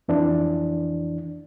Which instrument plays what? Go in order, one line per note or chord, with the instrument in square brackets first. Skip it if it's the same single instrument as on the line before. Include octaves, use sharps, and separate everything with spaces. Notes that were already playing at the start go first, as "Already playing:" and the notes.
[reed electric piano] F2 E3 D4